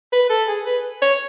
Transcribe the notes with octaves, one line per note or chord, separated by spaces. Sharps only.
B4
A4
G#4
B4
C#5